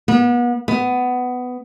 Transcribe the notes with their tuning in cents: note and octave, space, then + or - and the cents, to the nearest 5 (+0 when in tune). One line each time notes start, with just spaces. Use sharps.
B3 -35
B3 +15